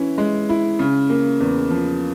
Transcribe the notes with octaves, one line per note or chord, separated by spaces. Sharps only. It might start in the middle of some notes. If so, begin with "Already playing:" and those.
Already playing: E3 C#4 E4
G#3
E4
C#3
A#3
E2
F3